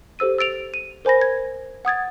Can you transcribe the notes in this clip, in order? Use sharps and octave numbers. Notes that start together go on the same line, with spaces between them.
G4 A4 C5 E6 D#7
E6 A6 D7 F7
D#7
A#4 C5 G#5 B5 A#6
G#6
F#5 D#6 G#6 A6